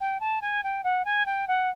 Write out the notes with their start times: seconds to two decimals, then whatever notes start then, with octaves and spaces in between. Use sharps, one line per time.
0.01 G5
0.20 A5
0.41 G#5
0.64 G5
0.84 F#5
1.05 G#5
1.26 G5
1.48 F#5